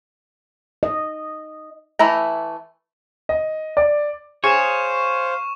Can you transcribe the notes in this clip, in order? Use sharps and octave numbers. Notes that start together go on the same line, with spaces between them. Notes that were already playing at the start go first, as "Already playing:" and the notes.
D#5
E3 A3 E4 A#5
D#5
D5
G#4 C5 C#5 F5 C#6 E7